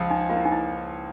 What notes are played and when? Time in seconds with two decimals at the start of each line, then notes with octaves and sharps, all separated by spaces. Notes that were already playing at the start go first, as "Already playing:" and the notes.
Already playing: C#2 F3
0.10 D#4
0.29 A#3 F4
0.37 E4
0.45 D#4
0.52 E4